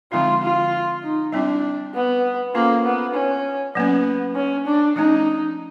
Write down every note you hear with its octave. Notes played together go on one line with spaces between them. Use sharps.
D3 F3 G#3 C4 D#4 F4
F4
D#4
G3 C4 D4 E4
B3
A#3 C#4 F4 A4 C5
B3
C#4
F#3 A#3 B3 C#4
C#4
D4
F3 A3 C#4 D#4